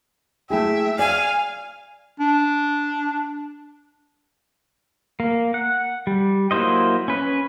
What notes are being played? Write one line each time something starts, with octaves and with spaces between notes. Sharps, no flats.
A3 E4 G#4 E5 G5
D5 F5 G#5
D4
A#3
F#5
G3
F#3 A#3 E4 C5 D#5
C#4 B4